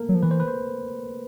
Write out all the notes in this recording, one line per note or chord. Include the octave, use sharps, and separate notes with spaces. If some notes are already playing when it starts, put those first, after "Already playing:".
Already playing: A3 A#3 A4 A#4
F#3
F3
E3 B4
C5
B4
C5